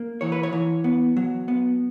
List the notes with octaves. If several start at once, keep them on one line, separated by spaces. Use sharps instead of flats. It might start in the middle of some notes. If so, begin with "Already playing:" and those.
Already playing: A#3
E3 C#5
B4
C#5
E3
B3
F#3
B3